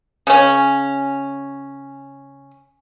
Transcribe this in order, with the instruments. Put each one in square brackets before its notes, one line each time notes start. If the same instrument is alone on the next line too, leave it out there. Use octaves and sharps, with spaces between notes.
[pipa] C#3 C#4